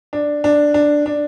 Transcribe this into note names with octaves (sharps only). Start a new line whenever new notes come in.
D4
D4
D4
D4